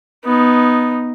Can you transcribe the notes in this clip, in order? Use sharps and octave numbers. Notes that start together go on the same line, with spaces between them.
B3 D#4